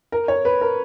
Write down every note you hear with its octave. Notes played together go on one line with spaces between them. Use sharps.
A#4
C#5
B4
A#4